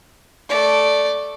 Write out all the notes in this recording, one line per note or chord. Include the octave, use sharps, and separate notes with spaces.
A3 D5